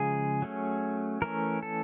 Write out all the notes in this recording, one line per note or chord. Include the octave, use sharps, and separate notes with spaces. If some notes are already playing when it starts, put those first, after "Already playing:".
Already playing: C#3 F3 G#3 G#4
F#3 A3 C#4
E3 A3 C#4 A#4
A4